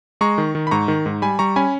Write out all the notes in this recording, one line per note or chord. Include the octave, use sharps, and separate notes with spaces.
G#3 A#5 C#6
D#3
D#3
B5
G#2 A#5 C#6
D#3
G#2
G3 G#5 B5
G3 A#5 C#6
C#4 G#5 B5